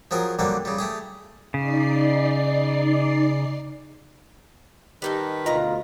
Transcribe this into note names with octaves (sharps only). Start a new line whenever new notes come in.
F3 F#3 C4 G#4 A#4
D3 F#3 G3 A#3 C4
C#3 G3
A3 G4 G#4
C#3 D#4 D5 C7
D#3 G3 D#4 A4 B4
D2 B2 F4 D#5 A#5